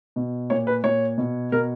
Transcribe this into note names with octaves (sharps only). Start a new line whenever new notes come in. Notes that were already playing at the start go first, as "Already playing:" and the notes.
B2
A#2 C#5
B4
A#2 C#5
B2
B2 A#4